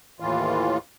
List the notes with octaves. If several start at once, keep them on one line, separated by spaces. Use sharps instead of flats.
D#2 A2 E3 F4